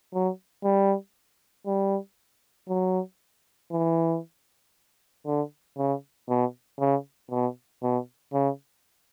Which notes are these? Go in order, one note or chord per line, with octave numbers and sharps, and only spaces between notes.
F#3
G3
G3
F#3
E3
D3
C#3
B2
C#3
B2
B2
C#3